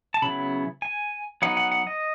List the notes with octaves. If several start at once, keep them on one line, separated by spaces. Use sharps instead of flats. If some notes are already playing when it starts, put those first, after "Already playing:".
A5
C#3 F#3 B3 E4 B5
G#5
F#3 B3 D#4 F#5
F#5
F#5
D#5